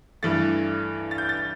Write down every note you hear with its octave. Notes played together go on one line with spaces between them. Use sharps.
G2 E3 A3 A6
A6
G6
A6